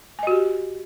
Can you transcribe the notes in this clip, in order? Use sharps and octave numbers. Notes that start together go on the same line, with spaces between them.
F#4 G4 D#5 G#5